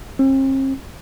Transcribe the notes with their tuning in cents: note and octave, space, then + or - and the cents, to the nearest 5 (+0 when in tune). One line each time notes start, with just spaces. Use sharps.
C4 +45